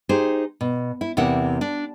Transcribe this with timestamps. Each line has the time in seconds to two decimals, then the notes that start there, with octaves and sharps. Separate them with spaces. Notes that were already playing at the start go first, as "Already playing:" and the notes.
0.09 D#4 G4 G#4 C5
0.61 B2
1.01 E4
1.17 E2 C3 A#3 E4 F#5
1.61 D4